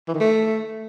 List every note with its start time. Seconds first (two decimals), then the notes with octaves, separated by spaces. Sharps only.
0.08 E3
0.14 D#3
0.20 A3